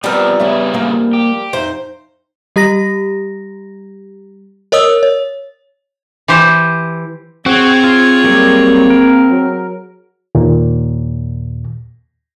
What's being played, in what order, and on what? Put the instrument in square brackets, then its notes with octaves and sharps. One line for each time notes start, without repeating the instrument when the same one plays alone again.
[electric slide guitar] B2 F3 C4 [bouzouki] G3 A#4 [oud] B3 G4
[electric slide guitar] G2 C#3 E4 [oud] B3 C#5 E5
[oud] F3 A#3
[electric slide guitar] G4
[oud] F2 D#4 E5 [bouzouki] C5
[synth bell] G3 G4 A#5 A#6
A#4 C#5 D#5 D#6 E6
C#5
[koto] E3 G4 C5
[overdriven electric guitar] C4 [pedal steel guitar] F#4 [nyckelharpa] G#4 C#5
[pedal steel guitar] F4 C5
[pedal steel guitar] F#3 G3 [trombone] A#3
[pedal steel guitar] A#4
[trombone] F#3
[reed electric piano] D#2 A#2